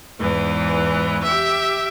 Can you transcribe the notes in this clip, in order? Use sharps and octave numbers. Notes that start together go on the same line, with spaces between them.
E2 G#2 E3
G4 E5